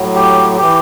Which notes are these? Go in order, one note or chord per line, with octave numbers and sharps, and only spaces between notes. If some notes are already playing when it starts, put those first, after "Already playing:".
Already playing: A2 F#3
G4
E3 G4